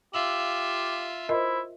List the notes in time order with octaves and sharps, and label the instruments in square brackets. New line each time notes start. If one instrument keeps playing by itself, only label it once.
[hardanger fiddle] F4 E5 [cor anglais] G4 [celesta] F5 E6 F#7
[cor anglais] E4 [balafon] F4 A#4 D#5 [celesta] C5 C6